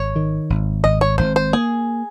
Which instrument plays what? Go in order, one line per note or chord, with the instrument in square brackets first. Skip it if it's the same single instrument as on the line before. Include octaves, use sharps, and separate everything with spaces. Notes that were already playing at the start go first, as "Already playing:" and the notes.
Already playing: [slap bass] G#1 [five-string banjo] C#5
[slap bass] D#3
G#1
[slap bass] G#1 [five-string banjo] D#5
[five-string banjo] C#5
[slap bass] G#1 [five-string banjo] C5
[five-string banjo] C5
[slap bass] A#3 [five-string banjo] G#4